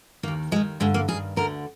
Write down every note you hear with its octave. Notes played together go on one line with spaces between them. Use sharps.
D#2 D#3 A#3
D#2 D#3 G#3
G2 D3 G#3
A#3
G2 D#3 G#4
D2 D3 A#4